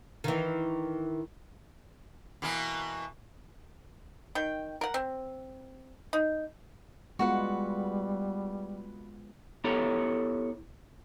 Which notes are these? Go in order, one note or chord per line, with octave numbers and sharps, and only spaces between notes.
D#3 E3
B2 E3 A#3
D#3 G5
A#4 F#5
C4
D#4
G3 G#3 B3 F4 F#4 B4 F#5
B3 E4 G4 A4 C#5 A#5